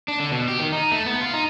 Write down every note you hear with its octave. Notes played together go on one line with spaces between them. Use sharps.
D4
D3
B2
G4
D#3
D#4
A3
B3
F4
D#4